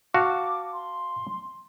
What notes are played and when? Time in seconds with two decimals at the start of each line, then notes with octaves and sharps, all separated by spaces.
0.14 F#4 F5 A5 D6
0.73 C6